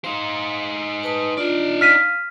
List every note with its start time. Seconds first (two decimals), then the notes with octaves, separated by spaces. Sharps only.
0.04 D#4 C5 F5
1.03 B4 A5 D#6
1.37 D4 D#4 F4 D5
1.81 F5 F6 B6 D#7